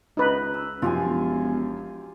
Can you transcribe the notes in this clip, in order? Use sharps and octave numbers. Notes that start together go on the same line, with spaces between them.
C#2 D#4 B4
E6
F#2 F3 F4 G4 G#5
E1